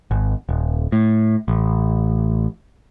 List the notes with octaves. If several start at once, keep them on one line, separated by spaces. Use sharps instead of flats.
G#1
D#1
A2
A1